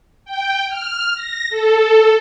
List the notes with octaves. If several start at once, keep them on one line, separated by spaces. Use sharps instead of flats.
G5
F6
A#6
A4